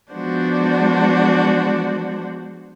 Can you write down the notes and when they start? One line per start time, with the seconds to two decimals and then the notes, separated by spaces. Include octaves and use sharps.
0.12 F3 G#3 B3 D4 F#4 C5